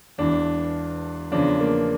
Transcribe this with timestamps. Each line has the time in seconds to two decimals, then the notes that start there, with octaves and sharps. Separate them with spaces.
0.18 E1 E2 E3 D4
1.32 E2 C#3 F3 D4
1.60 A#3